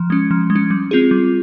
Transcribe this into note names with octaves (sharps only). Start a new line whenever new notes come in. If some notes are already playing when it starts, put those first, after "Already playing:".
Already playing: F3
G#3 C#4
F3
G#3
C#4
G3
C4 F4 G#4
G3